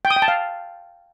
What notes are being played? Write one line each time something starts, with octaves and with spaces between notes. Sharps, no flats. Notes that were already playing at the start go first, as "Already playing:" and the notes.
G5
D#6
G5
A5
F5